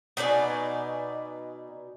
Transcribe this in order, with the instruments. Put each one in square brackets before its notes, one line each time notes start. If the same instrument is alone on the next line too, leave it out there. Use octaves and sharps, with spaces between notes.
[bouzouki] B2 D#4 D5 G#5